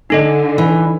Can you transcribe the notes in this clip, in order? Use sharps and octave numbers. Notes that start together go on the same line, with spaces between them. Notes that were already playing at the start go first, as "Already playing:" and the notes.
D3 D#4 A4 D#5
E3